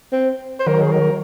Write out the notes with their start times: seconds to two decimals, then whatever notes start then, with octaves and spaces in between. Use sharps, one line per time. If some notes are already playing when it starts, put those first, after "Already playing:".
0.13 C4
0.60 C5
0.66 D#3 F#3 A#4
0.81 G#4
0.92 A#4